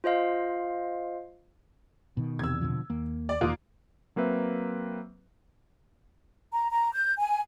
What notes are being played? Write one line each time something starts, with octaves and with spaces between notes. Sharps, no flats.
F4 C5 D#5 F5
B2 D#3
E2 C3 E6 G#6
B2 D3 F3
D#2 A#3
D5
E1 E2 D#3 A#3 F4 D6 D#6 F#6
F#3 A#3 C4 B4 E5
A#5
A#5
G6
G#5